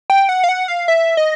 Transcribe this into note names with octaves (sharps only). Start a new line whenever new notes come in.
G5
F#5
F5
F#5
F5
E5
D#5